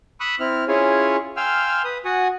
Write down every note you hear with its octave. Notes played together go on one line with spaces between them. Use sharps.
B5 C#6 D#6 E6 F#6
C4 E4 F6
C#4 E4 F4 G#4 C#5 G#5
F5 G5 G#5 C6 E6 F6
B4 D#6
F#4 F#5 G#5 D#6